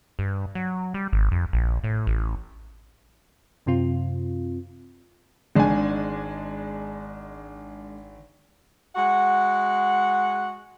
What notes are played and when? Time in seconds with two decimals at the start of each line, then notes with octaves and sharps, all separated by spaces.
0.19 G2
0.55 F#3
0.94 G3
1.13 G#1
1.31 F2
1.53 A#1
1.84 A2
2.07 A1
3.66 F#2 C3 C4 F4
5.55 G#1 G#3 D4 G#5
8.96 G#3 F#4 F#5